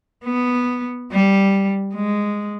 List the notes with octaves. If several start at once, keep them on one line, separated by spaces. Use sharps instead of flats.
B3
G3
G#3